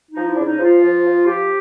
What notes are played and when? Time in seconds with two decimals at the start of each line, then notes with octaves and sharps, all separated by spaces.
0.10 D#4
0.15 F3
0.26 E4
0.35 D4
0.38 C#3
0.44 D#4
0.59 F3 F4
0.82 F3
1.04 F3
1.26 F3 G4